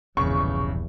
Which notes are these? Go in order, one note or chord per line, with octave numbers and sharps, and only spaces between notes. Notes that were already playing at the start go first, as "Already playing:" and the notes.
E1 A#1 E2 G2 C#3 C#6